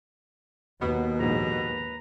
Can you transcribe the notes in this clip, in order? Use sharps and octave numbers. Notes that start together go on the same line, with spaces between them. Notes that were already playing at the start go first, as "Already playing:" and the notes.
D#2 B2 B3
A#1 G#2 B4 A#5